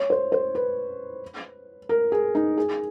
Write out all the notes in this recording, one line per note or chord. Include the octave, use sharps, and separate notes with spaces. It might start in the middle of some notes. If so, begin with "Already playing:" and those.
Already playing: C#5
C5
C5
B4
A#4
G#4
D#4
G#4